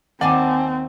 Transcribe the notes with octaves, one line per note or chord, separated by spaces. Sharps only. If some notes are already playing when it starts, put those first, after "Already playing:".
D#2 C4 D5 F#5 G#5 A5